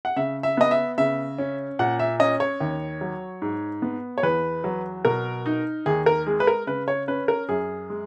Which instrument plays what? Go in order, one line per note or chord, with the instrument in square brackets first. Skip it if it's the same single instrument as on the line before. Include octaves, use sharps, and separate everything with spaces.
[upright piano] F#5
C#3 E5
E5
B3 D#5
E5
C#3 E5
C#4
A#2 F#5
E5
C#4 D#5
C#5
D#2
F#3
G#2
B3
C#5
E2 B4
F#3
B2 A#4
D#4
D#2 G#4
A#4
G#3 G#4
B4
A#4
C#3 B4
C#5
C#4 B4
A#4
F#2 G#4
G#3